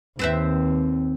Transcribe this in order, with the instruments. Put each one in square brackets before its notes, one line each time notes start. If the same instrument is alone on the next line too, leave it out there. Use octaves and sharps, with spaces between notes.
[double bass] D#2 [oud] C4 B4 E5